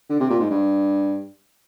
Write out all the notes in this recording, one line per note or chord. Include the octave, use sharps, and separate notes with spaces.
D3
C3
A#2
G#2
G2